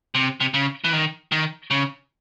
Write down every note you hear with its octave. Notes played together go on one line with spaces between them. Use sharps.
C3
C3
C#3
E3
D#3
D#3
C#3